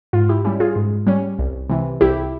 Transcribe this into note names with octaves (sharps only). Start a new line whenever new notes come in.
G#2 F4
E4 G4
G3 C#4 E4 G4
F4 G#4
G#2
G3 C#4
C2
C3 E3
C2 E4 G4